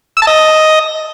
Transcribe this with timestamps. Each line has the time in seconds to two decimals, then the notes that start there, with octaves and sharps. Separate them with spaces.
0.17 E6
0.22 A5
0.27 D#5